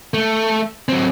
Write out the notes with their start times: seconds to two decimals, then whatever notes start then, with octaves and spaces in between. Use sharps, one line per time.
0.14 A3
0.89 F#3 C4